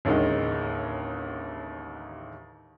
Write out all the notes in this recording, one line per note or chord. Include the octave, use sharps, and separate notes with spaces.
A1 D#2 D3 D#3 G#3